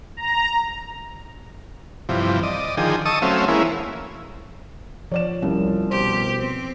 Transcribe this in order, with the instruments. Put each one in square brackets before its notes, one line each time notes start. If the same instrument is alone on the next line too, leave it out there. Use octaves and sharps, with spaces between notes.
[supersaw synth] A#5
[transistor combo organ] G2 C3 E3 F3
D5 D#5
D3 D#3 F3 G#4 G5
D#5 A5 C#6 D#6 E6
F#3 A3 C4 C#4 E5 F5
E3 G#3 A#3 C#4 E4
[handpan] F3 [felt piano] C#5 D5 E7
[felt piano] C2 [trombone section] F3 [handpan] C#4
[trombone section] B2 C5 [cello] G4
[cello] C4